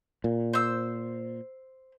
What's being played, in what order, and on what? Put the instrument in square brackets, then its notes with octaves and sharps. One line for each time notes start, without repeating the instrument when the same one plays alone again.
[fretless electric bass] A#2
[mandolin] C5 E6